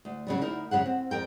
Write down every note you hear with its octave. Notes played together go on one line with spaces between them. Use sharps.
D2
C#3 F#3 G3
D2 D#4 E4 A#4
F#2 A#2 C#3 G#4 F#5
C4
F2 A#4 G5